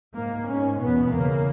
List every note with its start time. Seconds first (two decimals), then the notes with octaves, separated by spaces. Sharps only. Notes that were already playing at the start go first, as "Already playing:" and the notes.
0.15 G#2 A#3
0.48 G#2 C#4
0.80 E2 B2 B3
1.13 E2 C#3 A#3